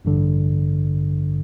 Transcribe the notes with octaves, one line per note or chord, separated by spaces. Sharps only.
A1 G2 D3